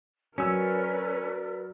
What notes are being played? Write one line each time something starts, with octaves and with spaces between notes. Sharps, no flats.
F#3 C#4 A#4 B4 D5 E6